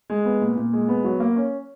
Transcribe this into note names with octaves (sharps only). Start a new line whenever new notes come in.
G#3
B3
A#2
A#2
G#3
B3
F#3
A#3
C#4